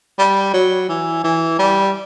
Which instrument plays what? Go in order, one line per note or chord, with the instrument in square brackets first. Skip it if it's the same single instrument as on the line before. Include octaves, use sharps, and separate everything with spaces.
[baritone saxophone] G3
F#3
E3
E3
G3